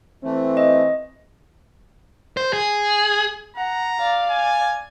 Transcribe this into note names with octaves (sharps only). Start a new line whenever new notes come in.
E3 A3 C4
D#5
C5
G#4
F#5 A#5
D5 F5
G#5